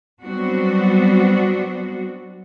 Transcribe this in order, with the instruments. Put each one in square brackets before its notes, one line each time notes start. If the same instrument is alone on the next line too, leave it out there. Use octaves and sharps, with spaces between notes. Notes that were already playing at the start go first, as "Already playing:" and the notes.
[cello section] F#3 G3 B3 C4 D4 F#4